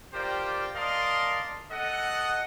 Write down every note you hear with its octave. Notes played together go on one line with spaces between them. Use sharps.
F4 G4 A#4 C5 D5 G5
A#4 D5 D#5 F5 A5 C6
A4 D#5 F#5